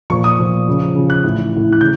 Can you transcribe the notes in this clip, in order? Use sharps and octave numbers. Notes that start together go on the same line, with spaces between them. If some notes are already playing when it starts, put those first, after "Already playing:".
A#2 F3 C#6
D#6
A#2 F3
C#3 F3
C#3 F3
F#6
A2 E3
A2 E3
F#6
C#3 G6